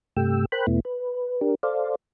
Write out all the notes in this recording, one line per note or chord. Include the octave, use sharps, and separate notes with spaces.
G2 C3 A3 G4 G5 E6
A#4 C5 G5 B5 F#6
E2 B2 A3 B3 E4
B4
D4 G4 A#4
A4 C5 D5 F5